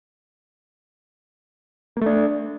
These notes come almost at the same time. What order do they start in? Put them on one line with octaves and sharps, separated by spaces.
A#3 A3 D4